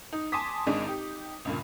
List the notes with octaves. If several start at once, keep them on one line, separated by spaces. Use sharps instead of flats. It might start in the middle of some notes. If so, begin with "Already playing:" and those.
D#4
G#5 A5 C6 D6 D#6 B6
G#1 G#2 D4 G#4 D#5
D#4 G4
C#2 G2 A#2